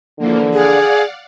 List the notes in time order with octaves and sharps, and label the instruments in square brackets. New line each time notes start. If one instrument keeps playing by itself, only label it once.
[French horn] D3 [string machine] E3 F3 A#3
[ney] G#4 [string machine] D5 F5 F#5